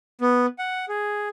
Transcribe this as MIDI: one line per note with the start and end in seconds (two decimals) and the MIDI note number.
0.21 0.46 59
0.59 0.85 78
0.89 1.29 68